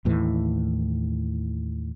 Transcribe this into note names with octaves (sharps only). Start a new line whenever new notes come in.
D#2 A2 E3